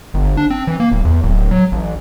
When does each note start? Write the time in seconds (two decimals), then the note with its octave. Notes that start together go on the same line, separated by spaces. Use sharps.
0.14 G1
0.37 D4
0.50 C4
0.67 E3
0.80 A#3
0.92 D1
1.05 E2
1.23 D1
1.51 F#3
1.72 A1